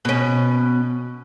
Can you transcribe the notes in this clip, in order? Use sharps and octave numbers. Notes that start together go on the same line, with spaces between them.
B2 C#4